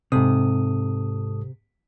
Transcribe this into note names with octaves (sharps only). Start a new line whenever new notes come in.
G#2 C3 A4 D#6